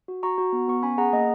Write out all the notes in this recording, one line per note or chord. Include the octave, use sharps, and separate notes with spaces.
F#4
F#4 A#5 C#6
F#4
B3
B3 C#6
C#4 G#5 B5
G#4 F#5 A#5
A#3 D#5 F#5